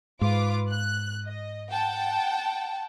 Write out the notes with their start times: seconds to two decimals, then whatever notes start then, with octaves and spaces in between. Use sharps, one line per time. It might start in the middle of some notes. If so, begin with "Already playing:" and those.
0.21 G#2 F4 B4 D6
0.72 F#6
1.25 D#5
1.71 F#5 G5 A5